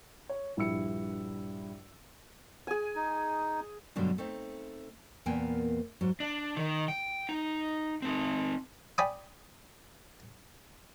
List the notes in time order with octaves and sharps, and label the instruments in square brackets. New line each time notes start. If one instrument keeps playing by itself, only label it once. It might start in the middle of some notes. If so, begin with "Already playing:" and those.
[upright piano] C#5
A#1 G2 E4 E6 C#7
[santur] G#4 G#5
[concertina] D#4
[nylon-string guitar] G2 B2 D3 F#3 G#3
A3 C4 D#4
E2 A#2 A#3 B3 G5 G#5
G#2 F#3
[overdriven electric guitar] D4
D#3
G5
D#4
C4 D#4
[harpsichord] D5 G5 G#5 B5 D6 D#6